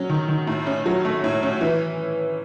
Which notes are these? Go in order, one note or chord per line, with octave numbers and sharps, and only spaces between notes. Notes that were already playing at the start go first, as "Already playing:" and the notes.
Already playing: F#3 C#4
D#3
D#3
A2
C#4
F#3
A3
A2
C#4
E3